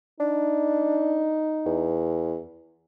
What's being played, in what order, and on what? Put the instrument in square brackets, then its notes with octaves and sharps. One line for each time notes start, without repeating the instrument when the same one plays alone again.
[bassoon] D4 [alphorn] D#4
[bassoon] E2